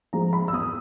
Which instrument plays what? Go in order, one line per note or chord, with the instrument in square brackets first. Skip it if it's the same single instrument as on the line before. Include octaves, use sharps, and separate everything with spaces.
[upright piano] F3 G#3 A#5
B5
E6
E2 D#6